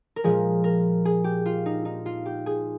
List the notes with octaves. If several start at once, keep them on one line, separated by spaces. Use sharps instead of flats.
A#4
A#2 F3 G#3 G#4
A#4
G#4
G4
F4
D#4
D#4
F4
G4
G#4